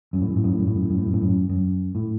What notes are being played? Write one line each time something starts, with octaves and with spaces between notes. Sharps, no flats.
F#2
A2
F#2
A2
F#2
A2
F#2
A2
F#2
A2
F#2
A2
F#2
A2
F#2
F#2
A2